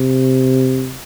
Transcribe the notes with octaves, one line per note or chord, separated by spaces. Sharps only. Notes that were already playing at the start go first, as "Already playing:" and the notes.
Already playing: C3